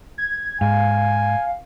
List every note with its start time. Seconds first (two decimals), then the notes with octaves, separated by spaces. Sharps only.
0.18 G#6
0.61 G#2 F5 G#5